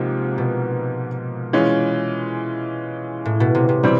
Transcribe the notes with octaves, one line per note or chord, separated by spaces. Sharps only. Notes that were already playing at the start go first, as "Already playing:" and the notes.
Already playing: G#2 C3 F3 A#3
B2
E3 G#3 C#4 F4
A2
B2
C3
C3
B2 E3 G3 C4